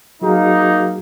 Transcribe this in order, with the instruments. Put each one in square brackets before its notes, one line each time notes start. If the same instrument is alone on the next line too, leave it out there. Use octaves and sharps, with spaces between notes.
[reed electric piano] F#3 F#4 G#4 [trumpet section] A#3 D#4